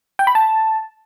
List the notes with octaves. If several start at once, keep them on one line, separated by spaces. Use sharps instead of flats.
G5
B5
A5